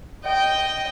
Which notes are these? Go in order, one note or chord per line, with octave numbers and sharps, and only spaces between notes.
D#5 G5